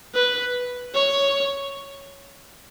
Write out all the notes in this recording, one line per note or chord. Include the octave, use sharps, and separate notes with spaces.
B4
C#5